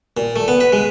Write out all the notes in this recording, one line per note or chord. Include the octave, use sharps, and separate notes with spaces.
A#2
A3
B3
B4
G#3